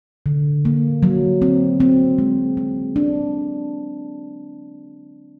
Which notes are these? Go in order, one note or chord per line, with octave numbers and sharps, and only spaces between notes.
D3
A#3
F#3
C4
C4
G#3
G#3
D4